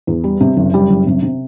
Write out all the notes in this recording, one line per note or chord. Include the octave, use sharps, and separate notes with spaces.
E2
G3
C3
F#1
G3
F#1
C3
C3